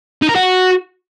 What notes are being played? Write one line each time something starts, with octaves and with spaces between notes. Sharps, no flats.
D#4
A#4
F#4